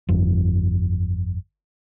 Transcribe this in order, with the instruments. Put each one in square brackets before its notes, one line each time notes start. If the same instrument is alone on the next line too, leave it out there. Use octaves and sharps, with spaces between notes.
[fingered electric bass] G1 F2